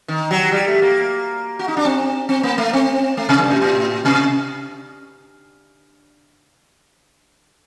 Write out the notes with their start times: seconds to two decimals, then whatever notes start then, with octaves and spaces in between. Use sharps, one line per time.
0.08 D#3
0.31 F#3
0.52 G3
0.68 A3
0.82 A#3
1.59 F#4
1.68 D#4
1.77 D4
1.85 C4
2.29 C4
2.43 A#3
2.58 A3
2.73 C4
3.17 A3
3.29 C3
3.39 G2
3.51 A2
3.62 A2
4.05 C3